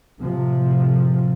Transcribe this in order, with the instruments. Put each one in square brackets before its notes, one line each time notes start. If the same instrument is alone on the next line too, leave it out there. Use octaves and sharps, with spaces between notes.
[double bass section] A2 C3 F3